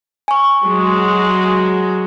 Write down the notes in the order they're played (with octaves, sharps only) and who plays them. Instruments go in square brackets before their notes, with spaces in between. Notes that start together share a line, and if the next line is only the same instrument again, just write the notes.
[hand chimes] G#5 C#6
[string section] F#3 G#3 F#4